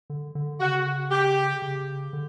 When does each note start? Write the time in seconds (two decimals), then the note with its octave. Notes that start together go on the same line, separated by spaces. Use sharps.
0.10 D3
0.35 D3
0.60 C#3 F#4
1.11 G4
1.62 C#3
2.13 D3